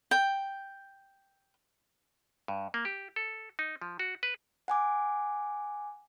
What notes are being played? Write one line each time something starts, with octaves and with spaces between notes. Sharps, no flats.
G5
G2
A#3
G4
A4
D#4
F3
F#4
B4
F#5 G#5 D6